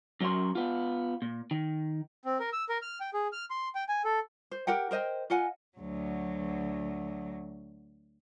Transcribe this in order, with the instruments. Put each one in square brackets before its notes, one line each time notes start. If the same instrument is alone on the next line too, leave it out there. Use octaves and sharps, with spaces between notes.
[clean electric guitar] F#2 F#3 C#4 A#4 C6
B3 F4
A#2
D#3
[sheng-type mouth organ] C4
A#4
E6
A#4
F6
G5
G#4
F6
C6
G5
G#5
A4
[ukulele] C5
G4 A#4 F#5 G5
A#4 C5 D#5 G5
F4 D#5 F#5 G#5
[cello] D2 F#3